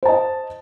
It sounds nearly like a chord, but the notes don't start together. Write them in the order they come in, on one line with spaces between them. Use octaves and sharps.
C5 A5 D#5